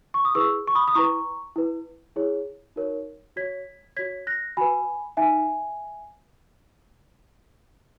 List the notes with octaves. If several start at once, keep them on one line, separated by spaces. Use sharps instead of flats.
C#6
D#6
E4 G#4 B4 C#6 E6
C#6
B5 D#6
D#6
E4 B4 A#5 C#6
E4 B4
E4 G#4 C#5
D#4 F#4 A#4 C#5
F#4 C#5 G#6 B6
F#4 C#5 G#6 B6
F#6 A#6
F#4 B4 G#5 B5
D#4 E5 G#5